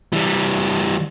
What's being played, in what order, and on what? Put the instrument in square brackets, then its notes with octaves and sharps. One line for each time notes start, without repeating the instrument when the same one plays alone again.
[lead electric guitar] E3 G3